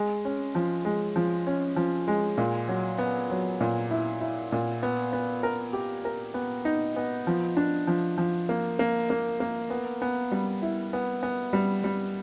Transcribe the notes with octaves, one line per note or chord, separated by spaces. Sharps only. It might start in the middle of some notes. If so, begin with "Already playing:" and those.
Already playing: G#3
C#4
F3
G#3
F3
C#4
F3
G#3
A#2
F#3
B3
F#3
A#2
E4
E4
A#2
B3
B3
A#4
G4
A#4
B3
D#4
B3
F3
D4
F3
F3
A#3
A#3
A#3
A#3
B3
B3
G3
E4
B3
B3
G3
G3